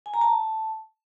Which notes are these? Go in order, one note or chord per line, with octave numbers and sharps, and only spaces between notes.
G#5
A#5
A5